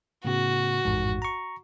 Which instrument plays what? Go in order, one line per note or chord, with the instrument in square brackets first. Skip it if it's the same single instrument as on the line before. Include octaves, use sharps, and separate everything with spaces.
[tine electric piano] A2 C#3 B3 [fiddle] F#4
[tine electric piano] A1 F2 G#2
A#5 C#6